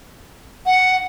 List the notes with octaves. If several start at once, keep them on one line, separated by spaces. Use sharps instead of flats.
F#5